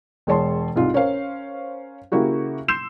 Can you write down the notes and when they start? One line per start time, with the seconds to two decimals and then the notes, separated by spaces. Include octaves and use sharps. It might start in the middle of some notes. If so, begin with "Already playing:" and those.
0.27 E1 G#3 C#5 A5 C6
0.76 C2 G#2 F4
0.94 C#4 A#4 C5 F5
2.12 C#3 A#3 E4 F#4 G4
2.68 C6 E6 G6 C7 E7